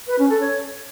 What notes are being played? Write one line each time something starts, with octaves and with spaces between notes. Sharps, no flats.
B4
C#4
A4
C#5